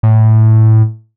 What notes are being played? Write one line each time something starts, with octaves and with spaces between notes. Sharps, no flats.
A2